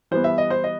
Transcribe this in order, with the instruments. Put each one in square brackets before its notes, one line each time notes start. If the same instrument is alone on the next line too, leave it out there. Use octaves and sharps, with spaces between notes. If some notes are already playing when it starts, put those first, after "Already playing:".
[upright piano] E3 G3 B3 C5
E5
D#5
C5
D#5